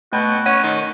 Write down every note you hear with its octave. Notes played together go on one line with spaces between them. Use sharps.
B2 A3 F#4
C#4 F#5
D#3